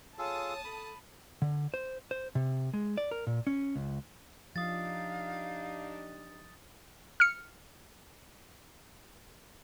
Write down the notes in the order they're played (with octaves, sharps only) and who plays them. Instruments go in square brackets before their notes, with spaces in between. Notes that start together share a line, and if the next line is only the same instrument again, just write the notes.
[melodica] F4 G#4 A4 [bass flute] C#5 [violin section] A5 D#6
[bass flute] A4 [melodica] B5
[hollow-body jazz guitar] D3
C5
C5
C3
G#3
D5
A#4
A#2
C#4
C#2
[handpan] F3 [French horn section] D4 D#4 G4 [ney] F5 [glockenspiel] D#6 A6
[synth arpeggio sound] F6 C#7